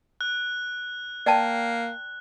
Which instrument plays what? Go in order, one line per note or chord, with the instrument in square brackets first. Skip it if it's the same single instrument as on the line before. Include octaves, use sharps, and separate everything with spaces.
[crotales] F#6
[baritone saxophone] A#3 [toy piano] D5 G5 A5